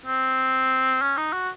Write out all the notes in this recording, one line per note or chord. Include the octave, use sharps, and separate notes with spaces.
C4
C#4
D#4
F#4